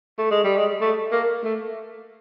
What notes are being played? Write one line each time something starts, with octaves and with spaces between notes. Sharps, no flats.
A3
G#3
G3
G#3
A3
A#3
A3